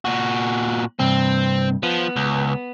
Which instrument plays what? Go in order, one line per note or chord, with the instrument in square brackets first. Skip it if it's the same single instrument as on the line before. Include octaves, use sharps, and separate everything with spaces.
[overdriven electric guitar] A#2 F#4
[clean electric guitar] G2 C3 [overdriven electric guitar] C4
[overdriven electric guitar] F3 [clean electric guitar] B3
[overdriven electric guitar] C#2